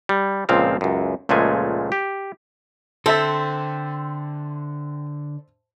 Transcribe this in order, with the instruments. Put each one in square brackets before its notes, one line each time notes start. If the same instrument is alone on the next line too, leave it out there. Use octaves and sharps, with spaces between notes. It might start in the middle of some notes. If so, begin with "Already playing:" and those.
[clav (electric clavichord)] G3
C#2 A#2 F3 C4 F5
C#2 F#2
C#2 A#2 F3 G#3 A3 G#5
G4
[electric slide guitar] D3 [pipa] C4 [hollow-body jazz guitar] A4 [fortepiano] C5 E5 A5